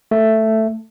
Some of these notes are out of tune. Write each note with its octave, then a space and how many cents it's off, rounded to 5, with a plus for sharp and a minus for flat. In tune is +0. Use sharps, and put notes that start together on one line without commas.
A3 +5